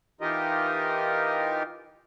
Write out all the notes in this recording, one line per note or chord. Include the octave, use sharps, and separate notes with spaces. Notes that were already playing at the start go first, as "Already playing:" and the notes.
E3 D#4 F4 G4 A#4 D#5